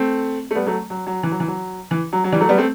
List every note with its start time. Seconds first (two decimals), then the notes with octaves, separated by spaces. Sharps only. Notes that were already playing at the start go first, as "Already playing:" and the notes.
Already playing: A3 C4
0.51 A3
0.55 G3 B3
0.67 F#3 A3
0.90 F#3
1.07 F#3
1.23 E3
1.32 F#3
1.40 E3
1.48 F#3
1.91 E3
2.13 F#3
2.24 F#3
2.32 E3 G3
2.41 F#3 A3
2.49 G3 B3
2.58 A3 C4